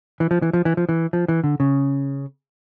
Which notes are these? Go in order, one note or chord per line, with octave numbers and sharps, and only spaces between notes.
E3
F3
E3
F3
E3
F3
E3
F3
E3
D3
C#3